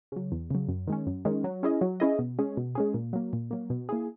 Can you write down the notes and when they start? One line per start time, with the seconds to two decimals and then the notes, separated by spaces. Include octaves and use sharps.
0.12 C#3 F#3
0.32 E2
0.51 C#3 F#3
0.68 F#2
0.87 D#3 G#3 C#4
1.07 F#2
1.25 D#3 G#3 C#4
1.44 F#3
1.63 C#4 E4 G#4 D#5
1.81 F#3
2.00 C#4 E4 G#4 D#5
2.19 B2
2.39 G#3 C#4 G#4
2.57 B2
2.75 G#3 C#4 G#4
2.94 A#2
3.13 F#3 A#3
3.33 A#2
3.51 F#3 A#3
3.70 B2
3.89 A#3 E4 G#4